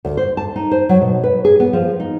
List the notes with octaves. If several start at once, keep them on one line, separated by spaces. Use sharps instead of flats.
D2
C5
A5
D#4
C5
F#3
B2
B4
G#4
B3
F3
D#4